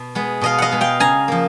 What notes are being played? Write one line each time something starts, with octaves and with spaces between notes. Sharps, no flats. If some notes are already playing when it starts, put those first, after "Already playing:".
Already playing: B2
G#3 B3
B2 D#5 F5
D#5 F5 F#5
G#3 B3
F5 G5
C#3 G#5 A#5
F3 A#3